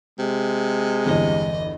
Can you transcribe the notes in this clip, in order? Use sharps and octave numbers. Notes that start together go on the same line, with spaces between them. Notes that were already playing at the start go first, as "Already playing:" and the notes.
C3 G#3
G1 E2 D#5